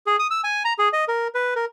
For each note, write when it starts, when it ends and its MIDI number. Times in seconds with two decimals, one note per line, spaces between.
0.06 0.16 68
0.19 0.27 87
0.31 0.41 88
0.44 0.63 80
0.65 0.73 82
0.79 0.89 68
0.93 1.05 75
1.08 1.28 70
1.35 1.54 71
1.56 1.65 70